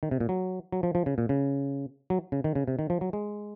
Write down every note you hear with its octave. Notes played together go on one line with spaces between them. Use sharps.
D#3
C3
A#2
F#3
F#3
F3
F3
C#3
A#2
C#3
F#3
C#3
D#3
C#3
C3
D#3
F3
F#3
G#3